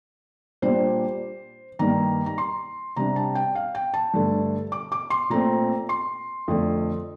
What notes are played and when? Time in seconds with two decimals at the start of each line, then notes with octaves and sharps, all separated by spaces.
0.62 A#2 G3 D4 C5
1.79 G2 D#3 G3 A#3 A#5
2.26 A#5
2.38 C6
2.96 C3 G3 D4 A#5
3.16 A5
3.35 G5
3.55 F5
3.75 G5
3.94 A5
4.14 G2 D3 A3
4.72 D6
4.92 D6
5.10 C6
5.30 A#2 A3 C4 A#5
5.89 C6
6.48 F2 D3 A3